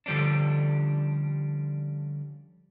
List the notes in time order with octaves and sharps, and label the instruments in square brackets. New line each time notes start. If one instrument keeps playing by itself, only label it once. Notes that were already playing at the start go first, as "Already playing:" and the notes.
[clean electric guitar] D3 F3 G3 C#4 D4